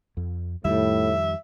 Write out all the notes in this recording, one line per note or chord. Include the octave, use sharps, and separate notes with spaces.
F2
F2 A2 D#3 G3 E5